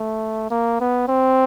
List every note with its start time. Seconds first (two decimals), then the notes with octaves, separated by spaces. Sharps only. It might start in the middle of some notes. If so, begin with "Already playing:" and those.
Already playing: A3
0.51 A#3
0.80 B3
1.08 C4